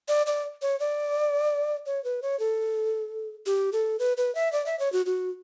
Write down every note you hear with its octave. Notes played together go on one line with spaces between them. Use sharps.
D5
D5
C#5
D5
C#5
B4
C#5
A4
G4
A4
B4
B4
E5
D5
E5
C#5
F#4
F#4